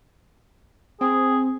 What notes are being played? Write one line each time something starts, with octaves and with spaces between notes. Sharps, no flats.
C4 G#4